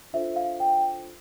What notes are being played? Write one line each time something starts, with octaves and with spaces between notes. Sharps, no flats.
D4 F4 A4 C5 E5
F5
G5